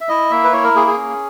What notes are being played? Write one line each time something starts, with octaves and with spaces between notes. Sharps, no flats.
E5
E4 D#5
A#3 E5
B4
E4 C#5
A#4
A#3 G#4
G#4
C#4